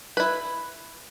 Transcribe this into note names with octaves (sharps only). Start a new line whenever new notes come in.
E4 B4